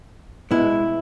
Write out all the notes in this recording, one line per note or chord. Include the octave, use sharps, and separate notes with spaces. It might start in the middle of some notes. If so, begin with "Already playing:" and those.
B2 G#3 B3 E4